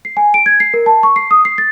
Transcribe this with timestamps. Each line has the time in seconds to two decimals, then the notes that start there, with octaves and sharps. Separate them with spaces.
0.05 C7
0.17 G#5
0.34 D7
0.46 G#6
0.60 C7
0.74 A#4
0.86 A5
1.03 C#6
1.16 C7
1.31 D#6
1.45 C7
1.58 A6